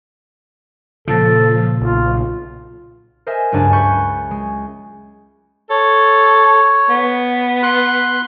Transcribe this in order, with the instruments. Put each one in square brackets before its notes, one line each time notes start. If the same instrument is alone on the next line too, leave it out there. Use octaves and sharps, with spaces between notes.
[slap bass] A#2 C#3 [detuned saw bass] F3 [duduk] A4
[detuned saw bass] B1 [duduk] F4
[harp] A#4 C5 D#5 E5 G#5
F#1 C#2 G2 D4 G#5 A5
G#5 B5 C#6 F#6 G6
G#3
[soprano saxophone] A4 [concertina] C#5
[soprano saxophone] B3
[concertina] C6 F#6